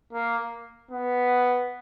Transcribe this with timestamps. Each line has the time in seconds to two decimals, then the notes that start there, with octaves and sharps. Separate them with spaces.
0.13 A#3
0.91 B3